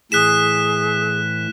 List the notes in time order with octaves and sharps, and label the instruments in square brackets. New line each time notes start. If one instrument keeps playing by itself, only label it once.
[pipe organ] A2 E3 [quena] G#4 [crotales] F#6 B6 E7